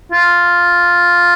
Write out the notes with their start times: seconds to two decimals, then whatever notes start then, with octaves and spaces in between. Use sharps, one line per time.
0.12 F4